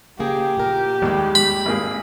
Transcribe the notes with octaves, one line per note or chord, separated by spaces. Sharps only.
C#3 A#3 G4 G#4
A#2 A#4
D#2 G3 G#3
B5
G#1 A#3 G#4